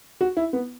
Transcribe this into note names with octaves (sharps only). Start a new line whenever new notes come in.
F#4
E4
B3